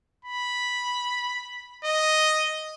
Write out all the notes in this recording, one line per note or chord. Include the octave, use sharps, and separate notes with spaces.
B5
D#5